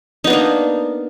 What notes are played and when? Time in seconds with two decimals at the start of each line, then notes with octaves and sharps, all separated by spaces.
0.24 D#4
0.27 B3
0.30 D4
0.33 A#3